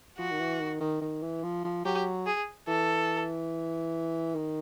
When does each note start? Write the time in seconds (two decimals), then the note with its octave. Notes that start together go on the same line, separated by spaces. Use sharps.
0.18 F3 F#4
0.31 D#3
0.40 E3
0.60 D#3
0.81 D#3
1.01 D#3
1.22 E3
1.43 F3
1.64 F3
1.85 F#3 G4
2.26 G#4
2.68 E3 A4
4.35 D#3